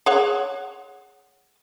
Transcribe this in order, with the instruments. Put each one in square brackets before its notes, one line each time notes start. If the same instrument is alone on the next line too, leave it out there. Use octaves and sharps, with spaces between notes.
[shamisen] G#4 C#5 F#5